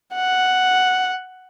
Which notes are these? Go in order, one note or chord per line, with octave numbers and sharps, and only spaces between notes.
F#5